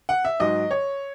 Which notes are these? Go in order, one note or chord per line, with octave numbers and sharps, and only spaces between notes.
F#5
E5
G#2 F#3 D#5
C#5